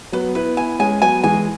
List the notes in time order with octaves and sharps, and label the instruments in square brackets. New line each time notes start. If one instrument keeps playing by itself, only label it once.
[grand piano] F#3 B3 [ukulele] B4
[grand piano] B3 E4 [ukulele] B4
[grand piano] B3 E4 [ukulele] G#5
[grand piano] G#3 C#4 [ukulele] G#5
[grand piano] F#3 B3 [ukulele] G#5
[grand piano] E3 G#3 [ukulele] G#5